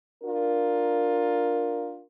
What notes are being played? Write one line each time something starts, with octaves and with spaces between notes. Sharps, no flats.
D4 F4 A#4